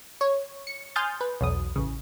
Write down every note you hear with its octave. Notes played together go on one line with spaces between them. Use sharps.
C#5
C#7
G#5 C6 D#6 F6 G6 A6
B4
B1 E2 D#6
A1 C#3